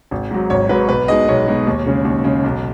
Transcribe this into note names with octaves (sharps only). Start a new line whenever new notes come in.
G#1
G#2 F#3
G#1 C#5
G#2 F#3 B4
B1 B4
B2 G#3 D#4 D#5
B1 C#5
B2 G#3 D#4
D#2
C#3 G#3
D#2
C#3 G#3
B1